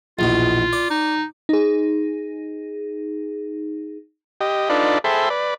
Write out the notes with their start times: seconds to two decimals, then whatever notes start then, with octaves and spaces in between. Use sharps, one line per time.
0.19 A#1 E2 B2 F4
0.73 D5
0.90 D#4
1.49 D#4 G#4
4.41 G4 D#5
4.70 D4 D#4 F4 A4 B4 D5
5.04 G#4 A4 C5 E5 G5 B5
5.30 B4 D5